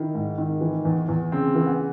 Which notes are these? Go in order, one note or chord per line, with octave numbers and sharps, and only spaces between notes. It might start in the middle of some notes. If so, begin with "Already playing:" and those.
Already playing: D#3 E4
G#2
D#3
E3
E2
E2
C#3 C4
E3
B3